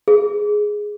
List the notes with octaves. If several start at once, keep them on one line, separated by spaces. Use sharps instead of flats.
G#4